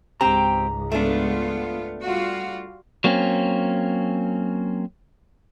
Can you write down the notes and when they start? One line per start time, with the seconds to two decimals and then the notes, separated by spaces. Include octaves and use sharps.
0.21 C#2 G#2 C4 G4 A#5
0.92 A3 B3 D4 F4
2.02 G3 F4 F#4
3.04 F#3 A#3 C4 C#4